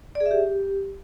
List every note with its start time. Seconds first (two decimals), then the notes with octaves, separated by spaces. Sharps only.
0.15 D5
0.20 G#4
0.26 E5
0.31 G4